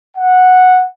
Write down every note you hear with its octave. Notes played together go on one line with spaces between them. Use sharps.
F#5